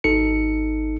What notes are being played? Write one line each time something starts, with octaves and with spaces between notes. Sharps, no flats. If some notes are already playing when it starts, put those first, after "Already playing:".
G#1 D#4 A4 C#7